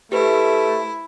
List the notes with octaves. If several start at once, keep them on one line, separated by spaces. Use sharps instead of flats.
A3 E4 G4 B4 C5